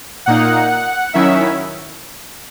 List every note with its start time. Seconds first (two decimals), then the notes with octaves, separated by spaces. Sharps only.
0.26 A#2 A#3 D#4 F#5
1.14 D#3 F#3 C#4 E4 E5